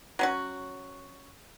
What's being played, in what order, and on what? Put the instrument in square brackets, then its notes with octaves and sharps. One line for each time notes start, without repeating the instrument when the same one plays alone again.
[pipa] F#3 C#4 F#4